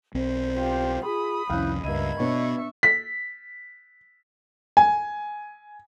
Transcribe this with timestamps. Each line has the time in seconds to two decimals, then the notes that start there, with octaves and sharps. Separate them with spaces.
0.14 B1 C4 C5
0.57 F4 G4
1.05 F4 G#4 B5 D#6
1.49 C2 F2 C#4 E4 F5 F#6 G6
1.84 C#2 G2 A#3 D#5 E5 B5 G#6 D#7
2.19 B2 B3 D4 C#5 E5 C#6
2.83 B6
4.77 G#5